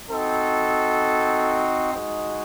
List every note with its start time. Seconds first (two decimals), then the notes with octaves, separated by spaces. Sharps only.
0.10 C4 D#4 F#4 A4
1.91 G#3 D#4 F#4